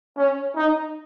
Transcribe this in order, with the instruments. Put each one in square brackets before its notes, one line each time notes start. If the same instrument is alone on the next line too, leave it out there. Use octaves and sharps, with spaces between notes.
[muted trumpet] C#4
D#4